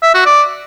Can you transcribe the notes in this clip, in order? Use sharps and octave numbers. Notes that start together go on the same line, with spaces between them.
E5
F#4
D5